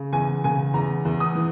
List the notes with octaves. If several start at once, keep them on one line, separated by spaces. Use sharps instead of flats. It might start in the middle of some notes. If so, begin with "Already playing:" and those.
Already playing: C#3
E2 G#5
C#3 G#5
E2 A#5
E2
D#6
E3